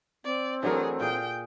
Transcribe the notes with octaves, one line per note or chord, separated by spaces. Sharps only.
C4 D5
E3 F#3 A3 D4 G#4 A#4
A#2 G#4 G5